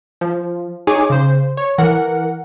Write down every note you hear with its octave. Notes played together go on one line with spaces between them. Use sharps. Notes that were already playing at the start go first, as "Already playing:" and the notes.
F3
D#4 G#4 C#5 G#5 D6
C#3 C5
C#5
E3 A#4 F#5